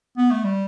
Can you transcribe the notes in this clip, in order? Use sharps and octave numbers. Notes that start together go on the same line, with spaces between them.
B3
A3
G3